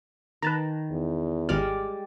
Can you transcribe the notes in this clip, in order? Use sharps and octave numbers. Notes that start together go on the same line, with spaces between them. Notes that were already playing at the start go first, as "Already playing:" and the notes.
D#3 B4 A5 A#5
E2
G#1 G3 G#3 D5 F6